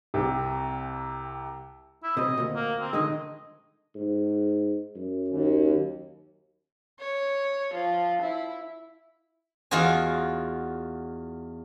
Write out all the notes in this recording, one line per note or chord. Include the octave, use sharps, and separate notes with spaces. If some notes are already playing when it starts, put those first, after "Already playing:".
C2 C3
E4
B1 C3 D#5
D2 A#2
A#3
C4
D3 D#3 G#3 D#5
G#2
F#2
D#2
C#5
F3
E4
E2 F4 F#4 D#5 G#5